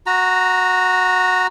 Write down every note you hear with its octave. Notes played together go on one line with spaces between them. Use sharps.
F#4 A#5